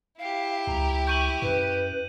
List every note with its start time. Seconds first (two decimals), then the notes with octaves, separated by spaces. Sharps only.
0.19 E4 G4 F5
0.67 C#2 A#5
1.07 C#6 G6 D#7 F#7
1.42 F#2 B4